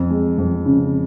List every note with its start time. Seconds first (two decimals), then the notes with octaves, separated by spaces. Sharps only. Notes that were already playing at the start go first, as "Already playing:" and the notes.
Already playing: F2
0.10 G#3
0.38 F2
0.65 C#3